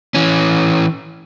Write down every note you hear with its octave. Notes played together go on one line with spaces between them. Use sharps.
E3 C#4